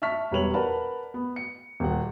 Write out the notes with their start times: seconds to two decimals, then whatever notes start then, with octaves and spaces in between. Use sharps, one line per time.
0.02 E5 A5 C#6 F6 B6
0.31 E1 G3 B4 C#5 F7 F#7
0.54 A#4 B4 D5 F#5 A5 B5
1.14 B3
1.36 C#7
1.80 D#1 F#5